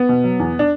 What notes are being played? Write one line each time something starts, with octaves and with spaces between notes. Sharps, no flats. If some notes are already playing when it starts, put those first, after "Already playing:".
Already playing: B3
B2
F#3
E2
D4